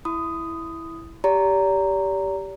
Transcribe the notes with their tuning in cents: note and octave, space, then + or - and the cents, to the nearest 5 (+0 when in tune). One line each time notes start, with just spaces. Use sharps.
E4 +0 B5 +40 D#6 +0
G4 +0 D5 -40 A#5 -10